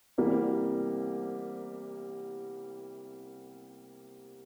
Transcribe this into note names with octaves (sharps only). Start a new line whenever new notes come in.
C2 C3 E3 G3 A#3